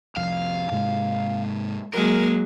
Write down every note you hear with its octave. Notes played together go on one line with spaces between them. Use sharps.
C2 F2 F5
G#2 C3 G#3
F#3 G#3 A#3 A#4